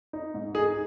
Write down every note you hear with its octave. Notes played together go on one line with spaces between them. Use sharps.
D#4
G#2
D#4 G#4